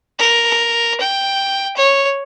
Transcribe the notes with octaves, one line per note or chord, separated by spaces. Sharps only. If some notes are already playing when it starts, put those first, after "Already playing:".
A#4
G5
C#5